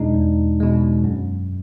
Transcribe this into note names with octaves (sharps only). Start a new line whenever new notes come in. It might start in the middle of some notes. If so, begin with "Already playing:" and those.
Already playing: E2 B2 G#3 D4 D#4
E2
B2 G#3
F#2